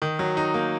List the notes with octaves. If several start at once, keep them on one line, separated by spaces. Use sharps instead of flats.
D#3
F#3
D#4
A#3